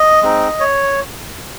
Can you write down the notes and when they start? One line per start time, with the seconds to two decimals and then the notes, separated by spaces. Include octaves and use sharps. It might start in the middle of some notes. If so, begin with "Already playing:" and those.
Already playing: D#5
0.21 G#3 C4 D#4
0.60 C#5